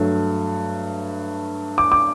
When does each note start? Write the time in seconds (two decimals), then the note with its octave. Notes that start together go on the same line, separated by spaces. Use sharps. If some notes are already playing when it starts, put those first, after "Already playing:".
Already playing: G2 F#3 A3
1.78 D6
1.92 D6